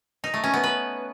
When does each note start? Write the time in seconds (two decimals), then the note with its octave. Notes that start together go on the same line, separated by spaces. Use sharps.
0.24 D#4
0.34 A3
0.44 C#4
0.54 B3
0.64 B4